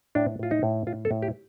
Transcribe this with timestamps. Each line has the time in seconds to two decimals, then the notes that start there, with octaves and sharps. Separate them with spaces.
0.15 A2 D4
0.39 A2 F4
0.51 D#4
0.63 A2
0.87 A2 F4
1.05 A4
1.11 A2
1.22 G4